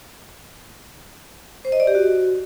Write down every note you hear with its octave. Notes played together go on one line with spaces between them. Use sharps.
C5
D#5
D5
G4
F#4